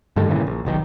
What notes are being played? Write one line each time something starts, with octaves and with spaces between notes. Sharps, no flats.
G2 D3 D#3 A3
G1 A#2 C#3 E3
A#1
F1 B1 A2 D#3